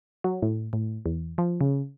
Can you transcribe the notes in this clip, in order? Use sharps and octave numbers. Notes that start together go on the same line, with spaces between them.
F#3
A2
A2
E2
F3
C#3